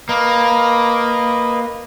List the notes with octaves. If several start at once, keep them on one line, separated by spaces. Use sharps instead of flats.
A#3 B4 D#5